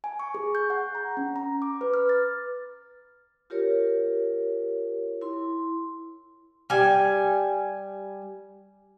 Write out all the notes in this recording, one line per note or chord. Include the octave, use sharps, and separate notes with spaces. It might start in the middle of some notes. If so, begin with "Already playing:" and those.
G#5
C#6
G#4
G6
F#5
A#5
C#4
A#5
D6
B4
F6
A6
F4 G4 A#4 C#5
E4 C6
G3 G#5